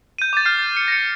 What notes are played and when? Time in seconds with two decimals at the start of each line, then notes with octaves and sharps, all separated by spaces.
0.18 G6 D#7
0.33 D6 A6
0.45 F6 G6 C7
0.58 A6
0.77 C#7
0.88 A#6 C#7